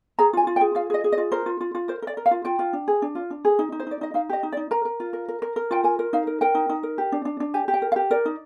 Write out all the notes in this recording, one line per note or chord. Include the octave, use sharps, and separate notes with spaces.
G#4 A#5
F4 G#5
F4
G5
G#4
F4 F5
G#4 D#5
G#4
D#5
F4
A#4 C5
F4
F4
F4
A#4 C5
A#4
D5
A#4
F5
F4
F4 G5
F4
D4
G#4
D4
F4
D4
G#4
D#4
D#4
C5
D#4 D5
D#4 D#5
D#4 F5
G4 D#5
D#4
D5
D#4
A#4 A#5
A#4
F4
A#4
A#4
A#4
A#4
F4 G5
A#4 G#5
A#4
D#4 F5
A#4
A#4 G5
D#4
D#4
A#4
G4
D4
D4
D4
G4 G#5
G4
G5
A#4
F5
G4
A#4 D5
D#4